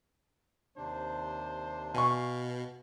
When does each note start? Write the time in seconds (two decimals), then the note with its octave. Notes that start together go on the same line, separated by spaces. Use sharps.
0.77 D#2 C3 D4 C5
1.94 B2 F5 G#5 C#6